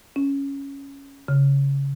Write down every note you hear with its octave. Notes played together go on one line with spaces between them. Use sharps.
C#4
C#3